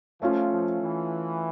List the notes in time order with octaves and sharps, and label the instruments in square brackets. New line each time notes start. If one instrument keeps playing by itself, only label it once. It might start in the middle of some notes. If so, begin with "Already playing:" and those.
[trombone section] F3 [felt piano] A3 C#4 F4
[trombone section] F3
E3